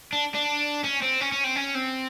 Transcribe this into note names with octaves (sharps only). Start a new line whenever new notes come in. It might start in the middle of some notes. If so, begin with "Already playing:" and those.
D4
D4
C#4
C4
C#4
C#4
C4
C#4
C4